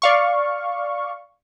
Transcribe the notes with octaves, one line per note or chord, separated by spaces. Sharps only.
D5 F5 C#6